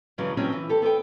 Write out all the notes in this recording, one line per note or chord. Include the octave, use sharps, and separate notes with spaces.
G2 C#3 E3 F#3 G#3
D#3 F3 F#3 G#3 C4 C#4
E3
G4 A4
B3 A4 C5 G5